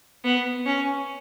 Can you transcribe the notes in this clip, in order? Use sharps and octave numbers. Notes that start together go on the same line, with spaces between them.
B3
C#4